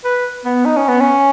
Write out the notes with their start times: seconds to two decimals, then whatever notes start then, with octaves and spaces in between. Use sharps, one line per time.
0.04 B4
0.45 B3
0.65 D#4
0.77 C#4
0.89 B3
1.01 C#4